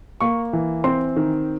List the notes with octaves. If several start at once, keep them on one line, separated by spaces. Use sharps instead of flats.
A#3 C#6
E3
C4 C6
D#3